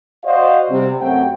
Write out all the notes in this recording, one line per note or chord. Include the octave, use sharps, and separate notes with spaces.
F#4 C5 D5 D#5 F5
C3 G3 C4
F#2 A3 C4 G4 F#5 G5